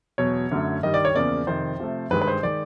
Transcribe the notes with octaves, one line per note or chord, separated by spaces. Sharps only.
E2 B2 F#3 C#5
F#2 D3 F#3 A3
G2 D#3 G3 D#5
D5
C#5
E2 C#3 F3 A#3 D5
F2 C3 D#3 C5
C3 F3 A3
G2 D#3 G#3 B4
B4
C5
D#3 G#3 D5